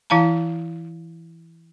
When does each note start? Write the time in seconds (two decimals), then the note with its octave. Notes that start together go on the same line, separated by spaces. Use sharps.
0.10 E3 E4 F5 A5 A#5